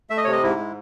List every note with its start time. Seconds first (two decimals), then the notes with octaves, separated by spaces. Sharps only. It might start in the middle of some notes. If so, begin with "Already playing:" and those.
0.10 A3 E5
0.17 D#5
0.24 C3 C#5
0.32 D#5
0.43 G#2 E4
0.59 G#3